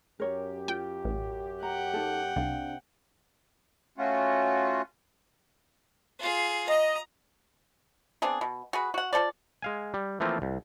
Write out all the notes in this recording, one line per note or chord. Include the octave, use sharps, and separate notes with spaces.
F#2 G4 A#4 C#5
F4 G5
A1
F#5 G5 A#5
D#4 A4
C2 C3 D4 F5
A3 C#4 F4 F#4
F4 G#4
D#5 A#5
B3 C4 D4 G#4
B2
F#4 G#4 B4
F#4 F#5
F4 A4 C5 D5
G#3 F5 G#5
G3
E3 F3 A3 A#3 C4 F4
C2